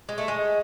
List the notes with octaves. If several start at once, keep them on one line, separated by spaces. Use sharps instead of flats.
G#3
A3
G#3